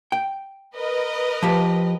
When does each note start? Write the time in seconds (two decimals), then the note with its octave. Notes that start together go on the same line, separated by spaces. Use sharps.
0.12 G5
0.75 A#4 B4 D#5
1.42 F3 G4